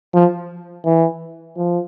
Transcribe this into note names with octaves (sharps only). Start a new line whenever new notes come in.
F3
E3
F3